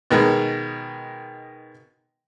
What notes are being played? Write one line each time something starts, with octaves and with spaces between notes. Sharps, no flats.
B2 D#3 G#3